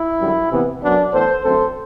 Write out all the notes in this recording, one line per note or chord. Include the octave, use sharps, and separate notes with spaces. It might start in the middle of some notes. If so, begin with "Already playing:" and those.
Already playing: E4
F#2 D3 G3
C3 E3 B3
F#2 F#3 B3 D4
A2 E3 B3 A4 C5
F#2 D3 A3 C4 A4 C5